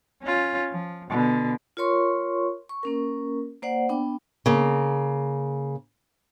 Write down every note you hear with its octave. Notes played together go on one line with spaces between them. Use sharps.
C#4 F4
F3
B2 D3
F4 A#4 C#5 C6 C#6
C#6
A#3 C#4 A#4
A#3 C5 D5 F#5
B3 D4 G5 D6
C#3 A#3